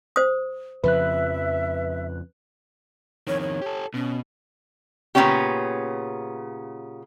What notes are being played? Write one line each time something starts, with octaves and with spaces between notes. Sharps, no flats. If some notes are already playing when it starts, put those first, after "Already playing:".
C5 D#6
F2 C#3 F3 B4 E5 F#6
F2 D#3 C#5
C#5
G4 A4
B2 C#4
A#2 C#3 A3 B3 C#4 G4